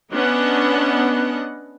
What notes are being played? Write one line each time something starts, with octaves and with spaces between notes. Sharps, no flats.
B3 C#4 D4 D#5 F#5